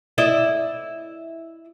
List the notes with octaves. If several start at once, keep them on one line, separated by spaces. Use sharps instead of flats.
E4 D5 D#5